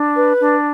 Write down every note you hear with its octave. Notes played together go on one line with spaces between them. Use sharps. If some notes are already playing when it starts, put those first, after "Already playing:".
Already playing: D4
B4
D4